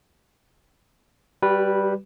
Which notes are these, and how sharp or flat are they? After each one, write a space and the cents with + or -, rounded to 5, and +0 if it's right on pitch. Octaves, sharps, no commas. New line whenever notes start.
G3 +0 F#4 +45 B4 -10